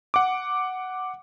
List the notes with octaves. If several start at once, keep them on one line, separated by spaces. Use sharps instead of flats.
F#5 D6